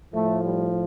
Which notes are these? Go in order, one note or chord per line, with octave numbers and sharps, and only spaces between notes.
A2 F3 A3
G3